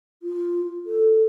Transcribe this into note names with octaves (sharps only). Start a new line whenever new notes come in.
F4
A4